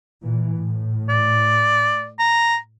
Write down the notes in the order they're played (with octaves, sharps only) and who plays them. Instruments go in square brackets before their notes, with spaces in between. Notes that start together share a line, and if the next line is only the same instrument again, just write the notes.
[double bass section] A#2 E3
A2
[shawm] D5
A#5